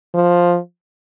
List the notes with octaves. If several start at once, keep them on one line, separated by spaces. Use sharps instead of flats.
F3